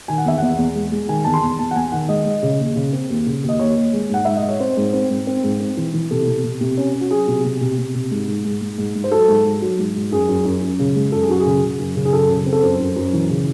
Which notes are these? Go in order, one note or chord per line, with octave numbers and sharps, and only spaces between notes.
D#3 G#5
F#5
E2 E5
E2 F#5
E2
G#3
G#3
D#3 G#5
E2 A5
C6
E2
E2 A5
F#5
E2 G#5
D#3 F#5
G#3 D#5
G#3
C#3
D#2
C#3
C4
D#2
C#3
D#2
D#5
D#2 C#5
D#2
G#3
G#2 F#5
G#2 E5
D#5
G#2
C#5
C4 C5
G#2
C4
G#2
C4
G#2
C4
E3
E3
C3 A4
C3
C3
C3
C#4
C#4
F#4
F#3 G#4
C3
C3
C3
C3
C3
G#2
G#2
G#2
G#2
G#2
G#2
C5
F#3 A4
G#2
G#2
F#3
G#2
G#2
F#2 G#4
F#2
F#2
F#2
C#3
G#3
F#2 A4
G#4
F#2 F#4
G#4
C#3
C#3
F#2
C#3
G#4
F#2 A4
C#3
C4
A4
F#2 C5
F#2
F#2
E3
C#3